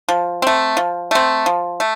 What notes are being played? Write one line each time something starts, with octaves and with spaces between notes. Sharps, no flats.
F3
A3 C4
F3
A3 C4
F3
A3